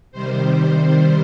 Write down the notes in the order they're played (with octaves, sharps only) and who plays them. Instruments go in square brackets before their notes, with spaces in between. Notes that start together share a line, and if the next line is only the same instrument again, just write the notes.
[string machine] C3 D#3 G3 C5
C5